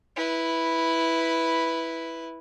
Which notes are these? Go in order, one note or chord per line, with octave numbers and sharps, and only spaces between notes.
E4 B4